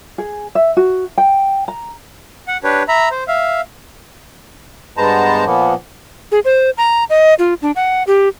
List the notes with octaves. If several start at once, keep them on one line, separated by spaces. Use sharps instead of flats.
G#4
E5
F#4
G5
A#5
F#5
D4 G4 B4 C#5
E5 A#5 B5
C5
E5 F5
G2 G#3 B3 C5 A5 A#5
A#2 F3 A#3 B3
G#4
C5
A#5
D#5
F4
D4
F#5
G4